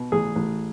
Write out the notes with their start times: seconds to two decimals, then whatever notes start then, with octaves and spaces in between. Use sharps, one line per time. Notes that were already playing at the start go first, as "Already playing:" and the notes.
Already playing: B2
0.12 A1 G#4
0.36 A1